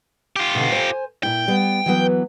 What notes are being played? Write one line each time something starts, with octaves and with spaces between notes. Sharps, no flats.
F4 G4
B2 D3
C5 G#5
A#2 E4 G5
G3 B3
E3 F#3 B3